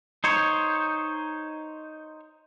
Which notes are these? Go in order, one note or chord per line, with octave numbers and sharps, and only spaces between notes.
D#4 C5 C#5